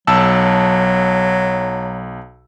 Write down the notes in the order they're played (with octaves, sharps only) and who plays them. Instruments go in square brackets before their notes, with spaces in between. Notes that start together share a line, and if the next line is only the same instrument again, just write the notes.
[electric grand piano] B1 A5 E6 [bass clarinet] F#3